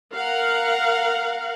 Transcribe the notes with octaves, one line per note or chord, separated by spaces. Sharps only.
A#4 F5 F#5